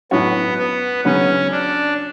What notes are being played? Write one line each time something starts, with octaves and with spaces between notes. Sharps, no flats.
A2 F#3 B3 C#4 F#4 C#5
B3
C#3 F#3 B3 C#4
D4